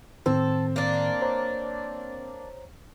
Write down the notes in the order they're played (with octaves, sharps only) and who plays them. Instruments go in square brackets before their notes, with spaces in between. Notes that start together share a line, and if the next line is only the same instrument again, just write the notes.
[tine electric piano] A2 D#3 [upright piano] C4 [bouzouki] A4
[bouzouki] A#3 D4
[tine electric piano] C5 C#5 A#5